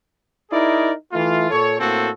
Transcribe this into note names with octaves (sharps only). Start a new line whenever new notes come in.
D#4 E4 G#4 A#4 D5
E3 A3 F4
A#2 A4 C#5
A2 A#3 C4 F#4 A4